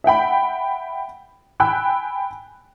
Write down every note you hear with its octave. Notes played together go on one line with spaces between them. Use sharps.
E5 F#5 G5 B5
G5 G#5 B5 E6 F#6